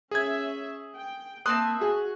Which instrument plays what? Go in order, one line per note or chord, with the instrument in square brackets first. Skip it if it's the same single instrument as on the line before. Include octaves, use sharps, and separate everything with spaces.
[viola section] C#4 E5 [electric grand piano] G#4 G#6
[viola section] G5
[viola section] A#3 E5 [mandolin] C4 A5 C6 [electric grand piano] D#6 F#6
[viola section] F#4 [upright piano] G#4